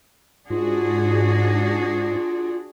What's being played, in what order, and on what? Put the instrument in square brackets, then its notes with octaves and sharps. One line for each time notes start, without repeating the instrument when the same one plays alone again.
[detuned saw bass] G#2 [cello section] D4 F#4 G#4 [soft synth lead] F4